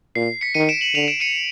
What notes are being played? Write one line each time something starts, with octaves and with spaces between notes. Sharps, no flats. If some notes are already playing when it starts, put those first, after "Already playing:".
A#2 C7
B6 C#7
D#3 C#7 D#7
D7 E7
E7 F#7
D3 D#7 F7
D7 E7
C#7 D#7